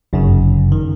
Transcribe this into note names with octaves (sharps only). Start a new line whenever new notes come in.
G1 F#2 C#3
D#3